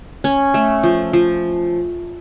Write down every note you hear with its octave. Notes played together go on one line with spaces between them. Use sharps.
C#4
A3
F3
F3